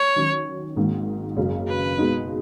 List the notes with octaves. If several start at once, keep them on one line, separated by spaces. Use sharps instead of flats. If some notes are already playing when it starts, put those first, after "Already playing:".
Already playing: C#5
D#3 F#3 C#4
G#1 G#2 D#3 A#3
F#1 F#2 C#3
B4
B2 G#3 D#4